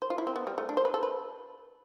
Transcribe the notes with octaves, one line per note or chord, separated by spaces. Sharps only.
C5
F4
E4
C4
B3
G3
A3
D4
C5
B4
A4
B4